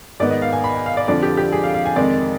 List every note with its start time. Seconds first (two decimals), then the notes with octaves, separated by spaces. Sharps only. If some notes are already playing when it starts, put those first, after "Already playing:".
0.20 G#2 D#3 B3 D5
0.31 D#5
0.42 F5
0.52 G#5
0.64 B5
0.75 G#5
0.86 F5
0.97 D5
1.08 F2 D3 F3 D5
1.23 G4
1.37 G4
1.52 G#4
1.63 F5
1.74 F5
1.86 G#5
1.96 F2 C3 D#3 G#3 D5